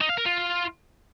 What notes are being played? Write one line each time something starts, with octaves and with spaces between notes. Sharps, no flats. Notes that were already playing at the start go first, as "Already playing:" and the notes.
D#4
F5
A#4
F4